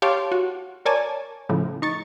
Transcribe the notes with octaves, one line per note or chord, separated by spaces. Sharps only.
G4 C#5 F5 A5 C6 D6
F#4
A#4 C#5 D5 G#5 A5
A2 C#3 F3
D#4 C#6 A6